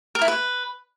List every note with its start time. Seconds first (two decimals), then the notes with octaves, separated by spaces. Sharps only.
0.15 A#4
0.21 E4
0.28 B4